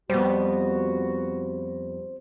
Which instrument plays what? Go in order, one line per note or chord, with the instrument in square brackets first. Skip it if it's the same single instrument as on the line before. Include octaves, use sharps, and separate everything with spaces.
[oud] F2 B3 [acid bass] G3 [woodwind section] F#4 [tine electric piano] C5